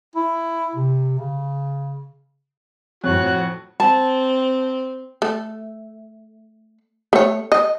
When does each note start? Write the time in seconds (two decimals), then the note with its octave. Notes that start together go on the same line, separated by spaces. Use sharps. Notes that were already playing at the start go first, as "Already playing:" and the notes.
0.16 E4
0.75 C3
1.19 C#3
3.04 F2 A2 F#4 C#5 F#6
3.80 C4 A5
5.22 A3
7.13 A3 C#5
7.52 D#5